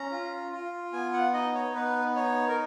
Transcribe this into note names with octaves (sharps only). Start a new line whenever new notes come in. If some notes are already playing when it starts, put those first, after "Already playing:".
Already playing: C#4 A#5
F4
F4
B3 G#5
F#5
D#4 D#5
C#5
B3 B4
D#4 C#5
A#4